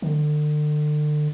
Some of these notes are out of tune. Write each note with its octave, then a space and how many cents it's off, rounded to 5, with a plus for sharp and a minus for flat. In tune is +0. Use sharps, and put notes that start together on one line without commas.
D3 +35